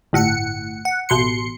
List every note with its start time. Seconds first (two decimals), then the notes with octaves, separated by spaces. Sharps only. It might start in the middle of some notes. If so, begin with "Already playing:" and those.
0.13 G1 A2 F#5 C#7
0.85 F#5
1.09 A1 B2 C6 C#7